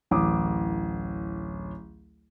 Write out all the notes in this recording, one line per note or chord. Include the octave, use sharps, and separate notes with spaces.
D1 A1 D6 D#6